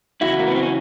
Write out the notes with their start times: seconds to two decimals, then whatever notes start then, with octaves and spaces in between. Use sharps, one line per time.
0.21 E2 C#3 F#3 E4 F#4
0.39 A#3
0.47 B3
0.55 C4
0.63 C#4